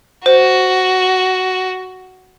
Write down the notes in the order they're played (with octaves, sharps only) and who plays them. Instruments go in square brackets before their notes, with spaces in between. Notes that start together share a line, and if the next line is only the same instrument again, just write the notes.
[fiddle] F#4 [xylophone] C5